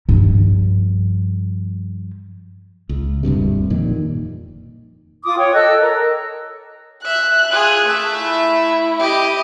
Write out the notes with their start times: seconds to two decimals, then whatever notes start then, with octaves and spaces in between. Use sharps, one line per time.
0.09 G2 F3
2.89 C#2
3.23 E1 D2 G2 C3
3.70 F2 A#2 D#3
5.24 F4 D6 D#6
5.38 C#5 G5
5.54 A4 D#5 E6 F#6
5.81 A#4
7.04 E5 F#6
7.50 F4 G#4
7.85 A3 E5
8.20 E4
8.99 G4 D#5